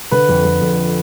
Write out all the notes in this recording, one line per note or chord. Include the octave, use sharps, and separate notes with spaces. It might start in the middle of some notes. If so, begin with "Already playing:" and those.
D3 B4
F2
F2
F2